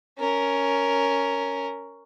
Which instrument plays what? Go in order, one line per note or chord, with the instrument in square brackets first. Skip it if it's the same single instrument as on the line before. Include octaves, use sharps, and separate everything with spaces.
[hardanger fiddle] C#4 A#4